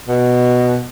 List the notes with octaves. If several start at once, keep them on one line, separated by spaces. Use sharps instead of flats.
B2